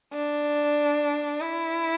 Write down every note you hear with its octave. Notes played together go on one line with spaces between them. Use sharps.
D4
E4